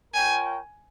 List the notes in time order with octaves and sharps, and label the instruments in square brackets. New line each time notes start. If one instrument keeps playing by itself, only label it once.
[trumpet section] F4 A#4 C#5 G5 [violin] G#5